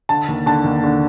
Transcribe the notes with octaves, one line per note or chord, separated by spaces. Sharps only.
D3 A5
D#2
D3 A5
D#2
D3